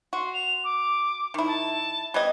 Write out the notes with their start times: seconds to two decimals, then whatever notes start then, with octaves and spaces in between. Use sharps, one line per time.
0.13 F#4 C6
0.33 F7
0.64 D6
1.34 D#3 E4
1.47 A5
2.14 G3 B3 D#5 G#6